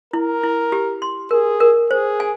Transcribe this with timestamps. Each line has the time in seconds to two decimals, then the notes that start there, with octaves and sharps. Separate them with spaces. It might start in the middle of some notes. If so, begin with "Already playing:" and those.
0.13 E4 A#4
0.43 E4
0.72 G4
1.02 C6
1.31 G#4 A#4
1.60 A#4
1.90 G#4 C5
2.20 G#5